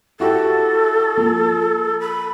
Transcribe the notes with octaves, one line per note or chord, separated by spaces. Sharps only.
E4 F#4 G4 A4
F3 A#3
B5